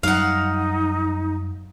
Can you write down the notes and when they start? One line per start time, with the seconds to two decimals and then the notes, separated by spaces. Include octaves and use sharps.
0.03 F#2 F#3 G3 D#4 F5 F#5